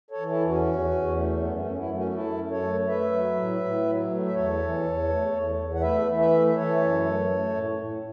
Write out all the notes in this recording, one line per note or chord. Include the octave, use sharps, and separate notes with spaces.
A4 C#5
E3
E4 A4
E2
C#4 F#4
E2
E2
A3
F#2 B3
A3 C#4
F#2
C#4
B3 E4
A3
C#4 F#4
F#4
F#2 E4 A4
F#2
A4 C#5
A3
A3 B4 E5
F#3
A2
A2
F#3
A3
E5
E2 A4 C#5
E3
E2
A3
E2
E2
F#5
A3 B4 E5
E3
B4 E5
A3
E5
E3 A4 C#5
F#2
A3
A3
A2
A2